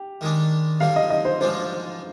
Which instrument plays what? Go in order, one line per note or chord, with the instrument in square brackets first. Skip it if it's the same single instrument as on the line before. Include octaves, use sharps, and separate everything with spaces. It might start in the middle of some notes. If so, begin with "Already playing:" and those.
Already playing: [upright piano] G4
[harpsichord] D#3 G#3 D4
[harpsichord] G2 D3 G3 [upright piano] F5
[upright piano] D#5
D#5
C5
[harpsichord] G#2 F3 G#3 D4 [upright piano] C5